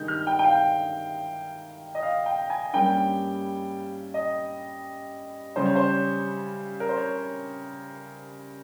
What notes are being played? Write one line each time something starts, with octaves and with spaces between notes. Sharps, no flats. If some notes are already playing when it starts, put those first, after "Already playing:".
Already playing: G2 D#3 G#3 D#4 G6
F6
G5
G5
F5
D#5
F5
G5
G#5
G2 G3 A#3 C#4 G5
D#5
C#3 G3 C#4 C5
C#5
C5
A#4
C5
C#5